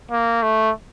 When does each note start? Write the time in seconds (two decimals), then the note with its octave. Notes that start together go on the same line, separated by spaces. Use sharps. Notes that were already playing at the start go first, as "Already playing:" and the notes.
0.11 A#3
0.43 A3